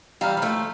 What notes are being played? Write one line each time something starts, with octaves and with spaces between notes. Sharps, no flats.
E3 G3 F5 A#5 F6
G3
F3 A3